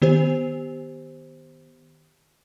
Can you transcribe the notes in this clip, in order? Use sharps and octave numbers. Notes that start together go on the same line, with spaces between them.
D#3 B3 G4 C5